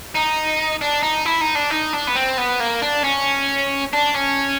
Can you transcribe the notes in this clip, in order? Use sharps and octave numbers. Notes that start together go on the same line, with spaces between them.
D#4
D4
D#4
E4
D#4
D4
D#4
D4
B3
C4
B3
A#3
D4
C#4
D4
C#4